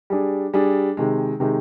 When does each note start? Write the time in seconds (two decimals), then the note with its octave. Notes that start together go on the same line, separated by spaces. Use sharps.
0.10 G3 D4 G#4
0.54 G3 D4 G#4
0.97 C3 D#3 G#3
1.40 C3 D#3 G#3